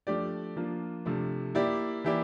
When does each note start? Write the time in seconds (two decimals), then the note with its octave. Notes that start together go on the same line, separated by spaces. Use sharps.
0.07 F3 A3 D4 G4 D5
0.56 F3 A#3 D4 F4
1.05 C3 F3 A3 D4
1.55 A#3 E4 G4 D5
2.04 E3 A#3 E4 G4 D5